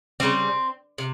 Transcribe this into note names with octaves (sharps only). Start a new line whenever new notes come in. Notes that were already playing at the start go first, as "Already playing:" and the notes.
C#3 G3 C4
C3